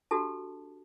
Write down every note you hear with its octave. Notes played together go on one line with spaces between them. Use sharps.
D4 F#4 G4 A4 A5